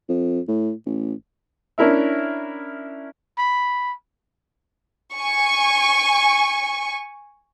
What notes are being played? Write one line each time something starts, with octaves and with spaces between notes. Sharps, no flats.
F2
A2
A1
C#4 D4 E4 A#4 E5
B5
G#5 C#6